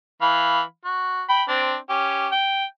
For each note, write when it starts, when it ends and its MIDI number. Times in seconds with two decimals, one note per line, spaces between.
0.22 0.62 52
0.22 0.62 77
0.22 0.62 83
0.85 1.23 66
1.29 1.43 79
1.29 1.43 83
1.48 1.76 60
1.48 1.76 62
1.90 2.29 61
1.90 2.29 67
2.32 2.65 79